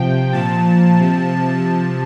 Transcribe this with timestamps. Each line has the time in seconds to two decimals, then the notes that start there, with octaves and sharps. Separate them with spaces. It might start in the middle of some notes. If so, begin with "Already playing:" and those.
Already playing: C3 F3 G5
0.33 A#2 F3 A5
0.97 C3 F3
1.61 C3 F3 A5